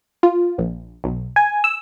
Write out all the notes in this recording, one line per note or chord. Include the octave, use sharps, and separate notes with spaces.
F4
A#1
B1
G#5
E6